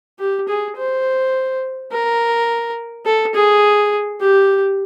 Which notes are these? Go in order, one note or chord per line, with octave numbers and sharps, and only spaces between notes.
G4
G#4
C5
A#4
A4
G#4
G4